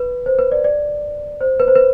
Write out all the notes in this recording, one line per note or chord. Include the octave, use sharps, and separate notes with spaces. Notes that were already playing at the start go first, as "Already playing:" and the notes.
Already playing: B4
C5
B4
D5
D5
C5
B4
C5
B4